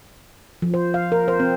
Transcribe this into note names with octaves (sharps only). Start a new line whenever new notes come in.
F3
C5
F5
A#4
C5
C4